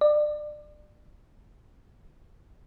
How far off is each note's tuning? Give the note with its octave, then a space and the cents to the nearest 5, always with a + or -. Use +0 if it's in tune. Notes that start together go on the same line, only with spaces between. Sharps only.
D5 +25